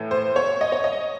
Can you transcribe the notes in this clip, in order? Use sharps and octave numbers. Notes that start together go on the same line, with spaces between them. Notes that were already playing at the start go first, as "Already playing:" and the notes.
Already playing: A2 E3 A3
C5
C#5
D#5
C#5
D#5